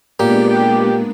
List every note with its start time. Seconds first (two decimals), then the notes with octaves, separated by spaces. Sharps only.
0.20 A#2 G#3 A#3 B3 D4 G4